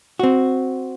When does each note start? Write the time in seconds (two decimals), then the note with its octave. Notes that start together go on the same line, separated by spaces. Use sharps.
0.19 C4 F#4